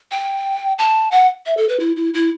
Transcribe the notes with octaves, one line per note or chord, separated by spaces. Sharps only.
G5
A5
F#5
E5
A4
B4
E4
E4
E4